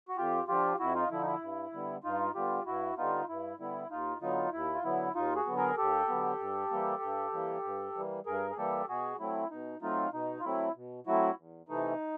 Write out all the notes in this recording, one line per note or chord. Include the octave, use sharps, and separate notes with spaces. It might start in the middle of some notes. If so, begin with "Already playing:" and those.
F#4
F2 F4 G4
D3 F3 F4 G4
F2 E4 F#4
D#4 F4
D3 F3 E4
D#4
E4
G2
D3 G3 B3
G2 D#4 F4
D3 G3 B3 F4 G4
G2 E4 F#4
D3 G3 B3 D#4 F4
G2 E4
D3 G3 B3 E4
D#2 D#4 F4
D3 F#3 B3 D#4 F4
D#2 E4
F4
D3 F#3 B3 E4
D#2 D#4 F4
F#4 G#4
D3 F#3 B3
G#4 A#4
D#2 G4 A4
D3 F#3 B3
G2
E3 G3 A#3
G2
E3 G3 A#3
G2
E3 G3 A#3
G2 G#4 A#4
G#4
E3 G3 A#3 G4 A4
B2 F#4 G#4
F#3 A3 C4 E4
B2 D#4
F#3 A3 C4 D#4 F4
B2 D#4
F4
F#3 A3 C4 E4
B2
F#3 A3 C4 E4 F#4
E2
C3 E3 A3 D#4